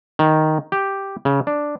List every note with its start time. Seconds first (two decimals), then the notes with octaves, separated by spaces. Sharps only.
0.19 D#3
0.72 G4
1.25 C#3
1.47 D4